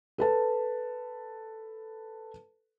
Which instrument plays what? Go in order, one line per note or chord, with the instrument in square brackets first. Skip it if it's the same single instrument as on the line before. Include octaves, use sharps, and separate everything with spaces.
[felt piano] A4 B4 A5